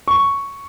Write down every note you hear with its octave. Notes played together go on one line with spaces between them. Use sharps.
C#6